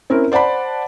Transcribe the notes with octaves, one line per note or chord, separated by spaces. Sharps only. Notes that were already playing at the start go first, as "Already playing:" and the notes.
C4 C#4 E4 A#4
C5 D5 F#5 A5 B5